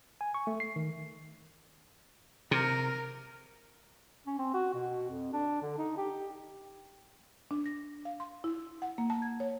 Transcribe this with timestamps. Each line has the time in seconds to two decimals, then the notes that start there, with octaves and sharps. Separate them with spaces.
0.21 G#5
0.34 C#6
0.47 A3
0.60 C7
0.76 D#3
2.51 C3 A#4
4.26 C#4
4.38 C4
4.54 F#4
4.74 B2
5.09 F2
5.33 D4
5.62 D3
5.78 D#4
5.97 G4
7.51 D4
7.66 A#6
8.05 F5
8.20 C6
8.44 E4
8.82 F#5
8.98 A#3
9.10 A5
9.22 G#6
9.40 C#5